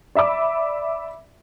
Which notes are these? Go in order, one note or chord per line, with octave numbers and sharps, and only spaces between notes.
D5 E5 B5 D6